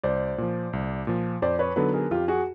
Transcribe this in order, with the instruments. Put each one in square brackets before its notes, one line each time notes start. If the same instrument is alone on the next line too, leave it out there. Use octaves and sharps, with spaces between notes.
[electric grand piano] C2 [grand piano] C5 D5
[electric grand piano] A#2 F3
C2
A#2 F3
[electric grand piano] F2 [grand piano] C5 D5
[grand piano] B4 C#5
[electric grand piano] D3 F#3 B3 D#4 [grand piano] A4 B4
[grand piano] G#4 A#4
[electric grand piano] F2 [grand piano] F4 G4
[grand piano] F#4 G#4